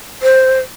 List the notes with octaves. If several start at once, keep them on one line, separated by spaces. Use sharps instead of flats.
C5